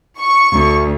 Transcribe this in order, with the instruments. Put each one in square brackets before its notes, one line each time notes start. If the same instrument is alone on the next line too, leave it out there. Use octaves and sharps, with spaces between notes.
[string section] C#6
[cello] D2